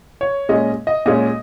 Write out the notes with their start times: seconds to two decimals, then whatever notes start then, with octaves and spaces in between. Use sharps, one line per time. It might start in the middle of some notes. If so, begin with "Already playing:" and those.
0.21 C#5
0.49 A#2 G#3 C#4 D#5
0.87 D#5
1.06 A#2 G#3 C#4 D#5